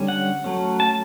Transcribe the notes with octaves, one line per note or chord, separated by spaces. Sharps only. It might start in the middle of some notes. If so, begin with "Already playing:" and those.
Already playing: D3 G3 C#4
F#5
F#3 A3 C#4
A5